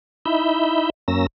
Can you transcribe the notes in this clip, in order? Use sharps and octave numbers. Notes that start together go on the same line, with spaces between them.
D#4 E4 E5 B5 G6
F#2 A#3 C#4 E6 A#6